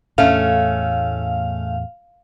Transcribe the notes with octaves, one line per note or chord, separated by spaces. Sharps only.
E2 A2 A3 C#4 F5